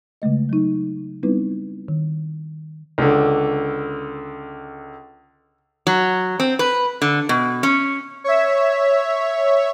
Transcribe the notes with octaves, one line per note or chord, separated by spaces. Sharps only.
C#3 G#3 A3 D#5
F#3 D#4
G3 B3 C4 D#4 E4 B4
D#3
C#2 D3
F#3
C4
B4
D3
B2
C#4
C#5 E5